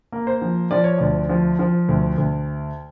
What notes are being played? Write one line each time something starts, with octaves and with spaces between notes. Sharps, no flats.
A#3
C5
F3
F3 D5
C#5
D2 D5
F3
F3
D2
D2